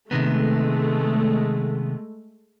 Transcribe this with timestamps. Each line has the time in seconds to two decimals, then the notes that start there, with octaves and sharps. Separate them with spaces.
0.11 C3 D#3 G#3 A3 B3